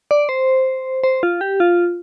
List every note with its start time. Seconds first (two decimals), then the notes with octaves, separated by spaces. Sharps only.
0.11 D5
0.29 C5
1.04 C5
1.23 F4
1.41 G4
1.60 F4